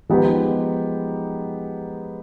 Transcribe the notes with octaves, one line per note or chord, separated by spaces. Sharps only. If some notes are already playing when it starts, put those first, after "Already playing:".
F3 G#3 B3 D#4 G4